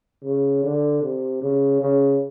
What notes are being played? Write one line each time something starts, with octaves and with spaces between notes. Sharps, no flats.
C#3
D3
C3
C#3
C#3